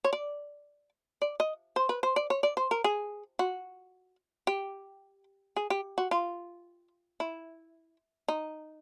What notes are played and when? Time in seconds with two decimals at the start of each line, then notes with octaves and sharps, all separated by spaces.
0.04 C#5
0.13 D5
1.22 D5
1.40 D#5
1.76 C5
1.89 B4
2.03 C5
2.16 D5
2.30 C#5
2.43 D5
2.57 C5
2.71 A#4
2.84 G#4
3.39 F#4
4.47 G4
5.56 G#4
5.70 G4
5.98 F#4
6.11 F4
7.20 E4
8.28 D#4